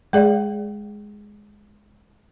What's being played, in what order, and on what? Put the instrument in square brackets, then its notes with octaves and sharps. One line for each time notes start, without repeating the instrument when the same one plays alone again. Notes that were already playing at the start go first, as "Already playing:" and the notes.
[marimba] G#3 G#4 D5 F5